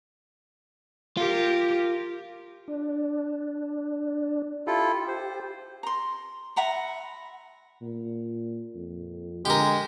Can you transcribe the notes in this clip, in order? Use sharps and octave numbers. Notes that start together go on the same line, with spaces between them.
F4 G4 A#4
D4
E4 F4 G4 A4
C5
A#5 C6
E5 F#5 A#5 B5
A#2
F2
D3 G#3 G4 A#4